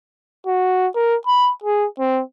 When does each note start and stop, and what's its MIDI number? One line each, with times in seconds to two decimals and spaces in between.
0.47 0.87 66
0.95 1.16 70
1.27 1.51 83
1.64 1.86 68
1.99 2.21 60